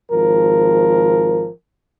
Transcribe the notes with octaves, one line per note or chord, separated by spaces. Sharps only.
G#1 F3 A#4